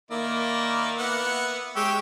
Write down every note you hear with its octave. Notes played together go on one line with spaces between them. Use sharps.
D#3 A#3 E4 D5
B3 E4 F#5
G#3 G4 C#5 E6